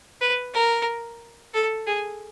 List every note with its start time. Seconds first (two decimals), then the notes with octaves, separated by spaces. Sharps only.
0.21 B4
0.54 A#4
1.54 A4
1.87 G#4